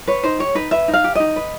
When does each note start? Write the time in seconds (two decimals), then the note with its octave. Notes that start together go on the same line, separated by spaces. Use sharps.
0.07 B4 C#5
0.24 D#4 C5
0.39 G4 C#5
0.55 D#4 B4
0.71 B4 E5
0.88 D#4
0.93 F5
1.04 G4
1.15 D#4 D#5
1.36 B4